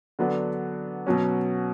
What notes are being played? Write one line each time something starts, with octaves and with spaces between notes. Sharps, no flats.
D3 F#3 B3 D4
B2 F#3 C#4